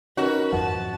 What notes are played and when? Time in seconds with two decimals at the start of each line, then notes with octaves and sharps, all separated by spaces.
0.17 C#4 D#4 F#4 A#4 B4
0.53 G#1 F2 F3 F#5 A5